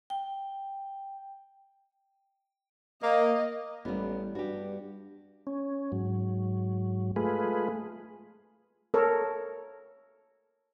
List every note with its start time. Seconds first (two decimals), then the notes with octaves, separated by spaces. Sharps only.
0.10 G5
3.03 A#3 D#5
3.85 A1 G3 B3
4.35 G2 F#4 G4
5.47 C#4
5.92 G#2 F#3
7.16 G#3 A3 F4 G#4 B4
8.94 A4 A#4 C#5